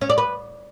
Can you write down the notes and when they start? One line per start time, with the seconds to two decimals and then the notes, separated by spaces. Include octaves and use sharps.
0.01 C#4
0.10 D5
0.18 B4